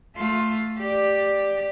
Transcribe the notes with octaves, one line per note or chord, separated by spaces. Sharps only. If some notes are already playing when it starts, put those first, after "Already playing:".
A3 F4
G4 D5